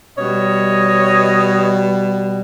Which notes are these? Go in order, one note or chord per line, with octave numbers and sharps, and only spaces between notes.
B2 G3 C#5 D#5